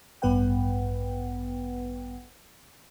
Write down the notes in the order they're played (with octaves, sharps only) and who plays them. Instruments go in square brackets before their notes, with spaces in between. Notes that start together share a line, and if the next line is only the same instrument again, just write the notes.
[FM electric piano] A1 G2 B3 B4 F#5 G5